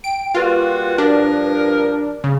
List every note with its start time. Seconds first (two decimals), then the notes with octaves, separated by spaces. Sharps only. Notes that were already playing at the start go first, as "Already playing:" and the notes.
0.04 G5 D7
0.35 G3 A#3 F4 F#4 B4
0.98 G2 F3 D4 A#4
2.24 C#3